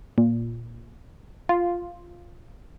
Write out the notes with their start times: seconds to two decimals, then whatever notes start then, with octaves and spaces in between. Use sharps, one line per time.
0.18 A#2
1.49 F4